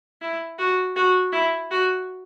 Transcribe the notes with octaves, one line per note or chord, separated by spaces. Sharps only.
E4
F#4
F#4
E4
F#4